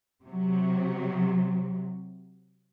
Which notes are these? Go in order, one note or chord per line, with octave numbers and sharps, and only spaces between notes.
C3 F#3